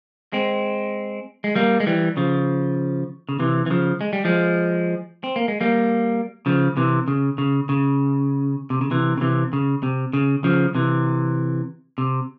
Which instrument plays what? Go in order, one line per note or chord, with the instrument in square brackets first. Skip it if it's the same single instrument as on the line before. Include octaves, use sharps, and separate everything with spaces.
[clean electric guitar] G#3 C4
G#3
G3 A#3
G#3
E3 G3
C#3 F3
C#3
C3 E3
E3
C#3 F3
G#3
G3
F3 G#3
C4
A#3
G#3
G3 A#3
C#3 F3
C3 E3
C#3
C#3
C#3
C3
C#3
C3 E3
C#3
C3 E3
C#3
C3
C#3
C#3 F3
C3 E3
C3